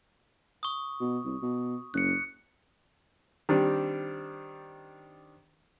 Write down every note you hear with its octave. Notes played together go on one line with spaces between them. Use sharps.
C#6 D#6
B2
C2
B2
F#1 F#6 C#7
D#3 G3 C4 D4